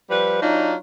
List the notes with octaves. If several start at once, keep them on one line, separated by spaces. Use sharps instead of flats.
F3 G3 B4
F#3 D4 D#4 F4